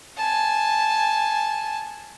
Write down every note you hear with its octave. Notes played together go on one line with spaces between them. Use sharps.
G#5 A5